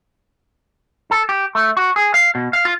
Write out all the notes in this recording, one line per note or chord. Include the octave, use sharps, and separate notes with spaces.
A4
G4
A3
F#4
G#4
F5
B2
F5
F4